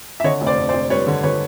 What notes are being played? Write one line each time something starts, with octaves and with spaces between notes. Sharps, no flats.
E5
D3 C#5 D#5
F1
C5 D5
F2
C5 D5
F1
G3 B4 C#5
D3
D3 B4 C#5